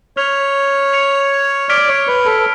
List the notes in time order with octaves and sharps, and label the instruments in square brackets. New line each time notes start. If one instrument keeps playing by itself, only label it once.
[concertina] C#5 [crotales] F6 B6 F7
[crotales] G#6 C#7 F7
[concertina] D5 [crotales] F6 B6 D7
[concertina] C#5
B4
A4